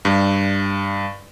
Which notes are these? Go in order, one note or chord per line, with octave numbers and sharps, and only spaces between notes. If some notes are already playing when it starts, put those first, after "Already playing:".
G2